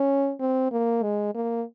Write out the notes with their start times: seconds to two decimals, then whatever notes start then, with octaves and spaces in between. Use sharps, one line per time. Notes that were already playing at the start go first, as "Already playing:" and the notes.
Already playing: C#4
0.40 C4
0.71 A#3
1.03 G#3
1.35 A#3